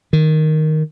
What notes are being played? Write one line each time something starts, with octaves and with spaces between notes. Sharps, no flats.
D#3